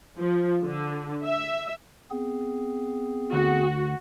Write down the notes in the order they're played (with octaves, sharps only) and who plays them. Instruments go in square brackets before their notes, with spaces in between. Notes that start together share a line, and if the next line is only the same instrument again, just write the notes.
[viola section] F3
D3
E5
[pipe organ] B3 C4 G#4
[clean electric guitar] D2 [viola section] F#4